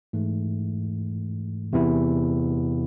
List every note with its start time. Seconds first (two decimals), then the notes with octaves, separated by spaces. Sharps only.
0.13 G#2 E3 A3
1.73 E2 C3 E3 B3 E4